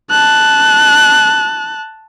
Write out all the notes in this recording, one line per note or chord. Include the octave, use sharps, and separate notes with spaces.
A5 F#6